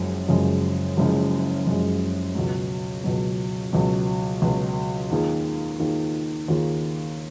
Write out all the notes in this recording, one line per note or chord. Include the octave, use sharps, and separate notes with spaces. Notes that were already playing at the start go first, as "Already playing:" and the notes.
Already playing: F#1 F#2 C#3 F3 G#3
F#1 F#2 C#3 F3 G#3
F#1 F#2 C#3 F3 G#3
F#1 F#2 C#3 F3 G#3
C#2 B2 F#3
C#2 B2 F#3
C#2 B2 F#3
C#2 B2 F#3
D#2 D#3 A#3 F4 G#4
D#2 D#3 A#3 F4 G#4
D#2 D#3 A#3 F4 G#4